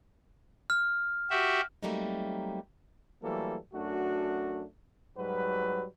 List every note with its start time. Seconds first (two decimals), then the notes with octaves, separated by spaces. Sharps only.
0.70 F6
1.30 F#4 G4 E5
1.83 F#3 G3 A3 A#3 C4 D#4
3.23 E3 F#3 G3 A3 A#3 A4
3.74 F#2 A3 D4 F#4
5.17 G#2 F#3 G3 F#4 B4